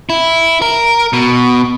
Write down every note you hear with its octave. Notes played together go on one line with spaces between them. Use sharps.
E4
A#4
B2